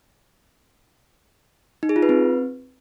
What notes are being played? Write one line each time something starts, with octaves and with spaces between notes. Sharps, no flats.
D#4
G#4
F4
B4
C4